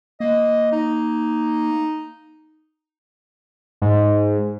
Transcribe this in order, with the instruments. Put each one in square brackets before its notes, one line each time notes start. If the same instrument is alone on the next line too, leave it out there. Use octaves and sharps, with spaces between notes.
[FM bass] A#3 [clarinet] D#5
[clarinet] D#4
[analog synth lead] G#2